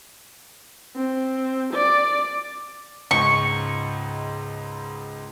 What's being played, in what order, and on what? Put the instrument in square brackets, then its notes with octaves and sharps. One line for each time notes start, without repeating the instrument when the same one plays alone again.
[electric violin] C4
D5
[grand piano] C#2 G#2 [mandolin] C#6